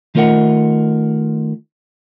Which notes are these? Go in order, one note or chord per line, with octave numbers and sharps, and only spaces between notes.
D#3 A3 F4 A#4 D#5 F#5